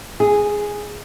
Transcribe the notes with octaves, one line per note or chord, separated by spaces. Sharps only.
G#4